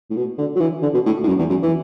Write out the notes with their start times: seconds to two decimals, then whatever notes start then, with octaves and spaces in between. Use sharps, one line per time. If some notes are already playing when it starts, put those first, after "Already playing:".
0.10 A2
0.16 B2
0.38 D3
0.55 F#3
0.60 E3
0.82 D3
0.94 B2
1.06 A2
1.24 A2
1.28 F#2
1.39 E2
1.50 F#2
1.62 E3